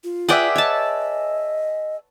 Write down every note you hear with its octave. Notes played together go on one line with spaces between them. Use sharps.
F4
G#4 B4 D5 E5 F#5 G5
C#5 D#5 A5